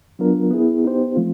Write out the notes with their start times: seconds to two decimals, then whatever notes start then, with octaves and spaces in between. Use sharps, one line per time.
0.19 F#3 B3 D4 F4 A#4
0.51 B3 E4 G#4
0.84 B3 D#4 G4 C5
1.16 F3 A3 C4 F4